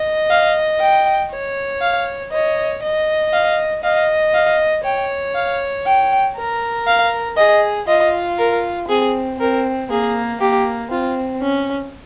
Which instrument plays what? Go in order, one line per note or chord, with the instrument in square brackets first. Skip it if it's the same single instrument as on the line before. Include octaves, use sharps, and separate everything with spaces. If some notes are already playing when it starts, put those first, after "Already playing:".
Already playing: [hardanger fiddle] D#5
[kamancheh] F5
G5
[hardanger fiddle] C#5
[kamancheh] F5
[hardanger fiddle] C#5 [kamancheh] D#5
[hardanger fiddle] D#5
[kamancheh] F5
[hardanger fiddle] D#5 [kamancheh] F5
[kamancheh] F5
[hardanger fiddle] C#5 [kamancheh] G5
[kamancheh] F5
G5
[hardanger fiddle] A#4
[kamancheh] F5
[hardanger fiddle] G#4 [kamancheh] D#5
[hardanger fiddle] F4 [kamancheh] D#5
[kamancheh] A#4
[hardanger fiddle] C4 [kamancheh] G#4
[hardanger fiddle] C4 [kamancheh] A#4
[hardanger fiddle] A#3 [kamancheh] G#4
[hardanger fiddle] A#3 [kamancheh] G4
[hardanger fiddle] C4 [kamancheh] F4
[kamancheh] C#4